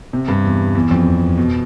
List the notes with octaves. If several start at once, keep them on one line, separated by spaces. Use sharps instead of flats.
C3
G2
E2
E2
F2
B2